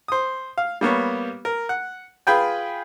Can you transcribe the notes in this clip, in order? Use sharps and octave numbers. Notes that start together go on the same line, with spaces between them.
C5 D#6
F5
G3 A#3 B3 C#5
A#4
F#5
F4 G#4 B4 G5 G#5